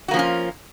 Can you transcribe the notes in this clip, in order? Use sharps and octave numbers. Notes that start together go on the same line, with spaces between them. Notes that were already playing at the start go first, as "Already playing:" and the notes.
F3 A#3 C#4 F4 F#4